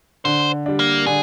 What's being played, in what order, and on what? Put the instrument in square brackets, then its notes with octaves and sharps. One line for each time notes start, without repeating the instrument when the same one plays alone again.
[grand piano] D3 [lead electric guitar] C5
[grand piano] G3 D4
[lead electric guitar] A#3
[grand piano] D3 [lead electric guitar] G#4